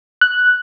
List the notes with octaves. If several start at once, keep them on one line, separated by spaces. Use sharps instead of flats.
F#6